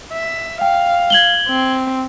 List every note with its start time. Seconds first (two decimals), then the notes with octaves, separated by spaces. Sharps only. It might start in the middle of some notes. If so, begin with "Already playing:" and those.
0.13 E5
0.61 F5 G5
1.10 G#6 F#7 G7
1.48 C4